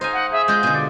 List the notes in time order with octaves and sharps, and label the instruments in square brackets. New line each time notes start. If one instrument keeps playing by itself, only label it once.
[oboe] D#4 [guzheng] C5 F5 G#5
[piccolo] F#5
[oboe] G#4 [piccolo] E5
[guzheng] G#3 F4 [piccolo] G6
[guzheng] B2 D3
[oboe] D5